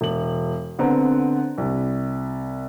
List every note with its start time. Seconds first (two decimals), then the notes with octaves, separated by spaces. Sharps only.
0.01 E1 F#7
0.79 D3 B3 C4 A#5
1.58 C2